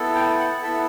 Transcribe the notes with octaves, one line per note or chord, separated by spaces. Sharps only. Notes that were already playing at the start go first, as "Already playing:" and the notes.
Already playing: B3 E4 A4
G5
F#5
B3 E4 A4 E5